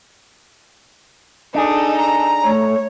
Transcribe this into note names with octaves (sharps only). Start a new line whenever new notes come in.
D4 D#4 G#4 A4
A#5
A3 C#5